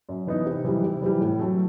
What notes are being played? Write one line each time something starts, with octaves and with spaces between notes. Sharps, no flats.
F#2
E3 B3 D#4
C3
E3 G3
C3
E3 G3
A2
F#3 A3